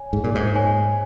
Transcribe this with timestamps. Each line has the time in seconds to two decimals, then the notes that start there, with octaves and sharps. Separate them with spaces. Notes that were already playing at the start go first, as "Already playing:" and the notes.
Already playing: C#5 G#5
0.13 G#2 G#4
0.24 A#2
0.35 G#2
0.55 C#5 G#5